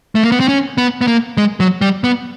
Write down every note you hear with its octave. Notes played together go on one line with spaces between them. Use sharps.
A3
A#3
B3
C4
C#4
B3
B3
A#3
G#3
F#3
G3
B3